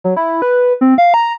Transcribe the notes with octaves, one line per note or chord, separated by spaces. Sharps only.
F#3
E4
B4
C4
F5
A#5